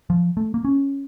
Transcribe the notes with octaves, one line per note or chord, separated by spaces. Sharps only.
F3
A3
A#3
C#4